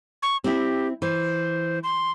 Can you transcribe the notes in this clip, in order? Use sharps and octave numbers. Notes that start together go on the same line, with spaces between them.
C#6
C4 E4 G4
E3 C5
C6